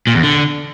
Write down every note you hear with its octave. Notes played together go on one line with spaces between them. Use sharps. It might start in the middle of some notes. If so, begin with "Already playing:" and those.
A#2
E2
D3